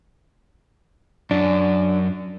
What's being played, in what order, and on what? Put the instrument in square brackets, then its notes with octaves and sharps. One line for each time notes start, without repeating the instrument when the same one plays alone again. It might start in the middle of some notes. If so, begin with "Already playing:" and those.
[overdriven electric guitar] F#2 [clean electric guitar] D4